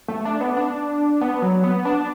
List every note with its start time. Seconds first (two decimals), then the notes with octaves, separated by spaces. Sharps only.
0.08 A3
0.25 D4
0.41 B3
0.57 D4
1.21 B3
1.42 F#3
1.64 B3
1.85 D4